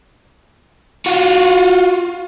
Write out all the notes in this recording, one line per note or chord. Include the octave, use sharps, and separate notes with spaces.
F4 F#4